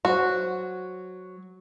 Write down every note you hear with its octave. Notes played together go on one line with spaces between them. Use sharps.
F#3 F#4 C5